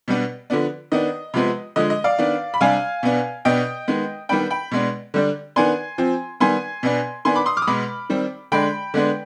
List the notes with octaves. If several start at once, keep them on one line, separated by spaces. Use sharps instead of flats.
B2 G3 B3 D4
D3 F3 B3 D4
D#3 B3 D4 D#5
C3 F3 G#3 B3
D3 F3 G#3 D#5
D#5
D5 F5
D#3 B3 D4
B5
C3 G3 D4 F5 G#5
B2 B3 D4
B2 B3 D4 D#5 G5
D#3 G#3 B3
D#3 G3 B3 D4 G5 B5
G5 B5
B2 G#3 B3 D4
D3 G3 D4
D#3 B3 D4 G#5 C6
F3 C4
D#3 G3 B3 G#5 C6
B2 B3 D4
D#3 B3 D4 G#5 C6
B5 D6
C6 D#6
D6 F6
D#6
B2 G#3 B3 B5 D6
D#3 G3 C4
D3 G#3 D4 G5 B5
D3 G#3 B3 D4